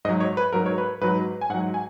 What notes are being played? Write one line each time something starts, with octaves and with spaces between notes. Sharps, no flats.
G#2 F#3 D#5
C#5
B4
G#2 F#3 A#4
C#5
B4
G#2 F#3 B4
G#5
G#2 F#3 F#5
G#5